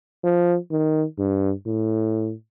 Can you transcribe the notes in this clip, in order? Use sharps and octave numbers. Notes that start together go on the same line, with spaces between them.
F3
D#3
G2
A2